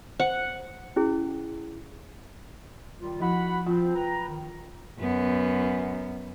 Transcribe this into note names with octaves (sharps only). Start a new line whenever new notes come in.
C5 F#5
C#4 E4 G#4
D#3 G3 F4
F3 E4 F#4 F#5 B5
F3 C4 F4
B4 G5 A#5
D#3
F#2 B3